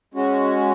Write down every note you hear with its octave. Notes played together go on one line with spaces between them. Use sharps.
G#3 C#4 F#4